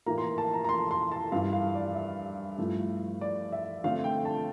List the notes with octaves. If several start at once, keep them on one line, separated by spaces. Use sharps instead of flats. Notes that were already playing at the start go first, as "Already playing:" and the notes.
A2 E3 A#3 A#5
C6
A#5
A5
A#5
A#5
C6
C6
A5
G2 E3 G3 F5
F5
D5
E5
G2 F3 A3 E4
D5
E5
D3 A3 C4 F5
G5
A5